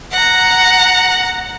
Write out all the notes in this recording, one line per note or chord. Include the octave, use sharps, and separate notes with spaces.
F#5 A#5